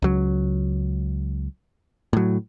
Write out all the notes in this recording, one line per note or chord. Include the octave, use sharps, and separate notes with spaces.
C#2 F#3
A2 F#3